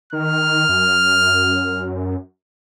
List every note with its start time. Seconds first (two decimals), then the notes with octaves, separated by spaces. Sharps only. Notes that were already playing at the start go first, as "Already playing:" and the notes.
0.13 D#3 F6
0.69 F#2